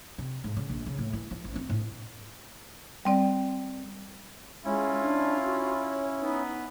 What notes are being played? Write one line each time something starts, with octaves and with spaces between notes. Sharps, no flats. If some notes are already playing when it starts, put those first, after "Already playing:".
C3
G#2
C#3
A#1
C#3
A2
E3
F3
A1
C4
A2
G3 C4 D5
G#3 C#4 E4 F4
D4
F#4
C#5
B3 D#4